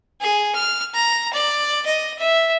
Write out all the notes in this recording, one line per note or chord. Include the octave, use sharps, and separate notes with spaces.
G#4
F6
A#5
D5
D#5
E5